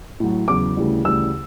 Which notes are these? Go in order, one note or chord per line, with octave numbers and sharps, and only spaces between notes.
A2 F#3
E2 C#3 F#3 D6
D2 C#3 E3 G3
D2 C#3 E3 G3 E6